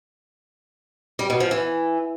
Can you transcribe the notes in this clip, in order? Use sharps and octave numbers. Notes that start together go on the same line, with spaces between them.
G3
B2
F3
E3